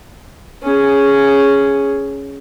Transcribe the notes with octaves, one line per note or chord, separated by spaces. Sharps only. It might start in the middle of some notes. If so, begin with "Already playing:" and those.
C#4 G#4